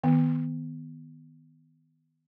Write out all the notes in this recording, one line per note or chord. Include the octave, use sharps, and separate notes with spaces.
D#3 B3